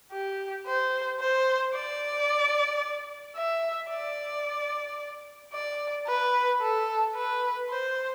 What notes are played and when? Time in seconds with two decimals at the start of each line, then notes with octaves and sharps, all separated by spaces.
0.12 G4
0.67 C5
1.20 C5
1.74 D5
3.36 E5
3.91 D5
5.53 D5
6.07 B4
6.61 A4
7.15 B4
7.69 C5